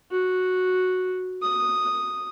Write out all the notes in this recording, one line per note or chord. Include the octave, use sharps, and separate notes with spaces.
F#4
D#6